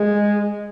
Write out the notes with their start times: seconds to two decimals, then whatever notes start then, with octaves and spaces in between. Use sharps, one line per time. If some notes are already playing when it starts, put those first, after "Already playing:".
Already playing: G#3